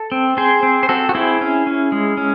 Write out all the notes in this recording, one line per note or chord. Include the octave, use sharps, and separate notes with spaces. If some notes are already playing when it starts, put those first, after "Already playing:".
Already playing: A4
C4
C4 G#4 C5
C4
C5
C4 F#4 A4
F#4
C4 E4 G#4
C#4
C#4
G#3
C#4